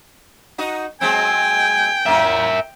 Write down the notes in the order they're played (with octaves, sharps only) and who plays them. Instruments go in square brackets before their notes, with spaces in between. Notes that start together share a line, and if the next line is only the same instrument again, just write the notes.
[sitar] D#4 F#4 D#5
[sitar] F#3 G#3 C4 [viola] G5 [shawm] G#5
[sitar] A#3 C#4 E4 [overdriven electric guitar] A#4 E5